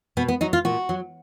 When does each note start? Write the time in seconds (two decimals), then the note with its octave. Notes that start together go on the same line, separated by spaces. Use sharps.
0.17 B2 B3
0.28 B3
0.41 F#3 D#4
0.53 F4
0.65 A#2 F#4
0.89 F#3